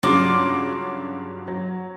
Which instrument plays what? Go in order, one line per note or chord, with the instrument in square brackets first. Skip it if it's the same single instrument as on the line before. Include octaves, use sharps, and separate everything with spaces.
[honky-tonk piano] G2 C#3 F#3 [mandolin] F4 D5 D6
[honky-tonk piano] F#3